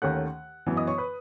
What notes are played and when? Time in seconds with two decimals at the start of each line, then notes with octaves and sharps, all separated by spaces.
0.02 D#2 D#3 A3 C#4 F#5 F#6
0.67 F#2 E3 B3
0.77 D#5 D#6
0.87 C#5 C#6
0.98 B4 B5